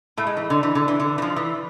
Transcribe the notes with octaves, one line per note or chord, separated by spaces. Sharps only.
A2 A3
G#3
E3
D3
E3
D3
E3
D3
E3
F3
E3